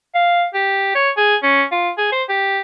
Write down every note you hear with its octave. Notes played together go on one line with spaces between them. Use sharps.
F5
G4
C#5
G#4
C#4
F4
G#4
C5
G4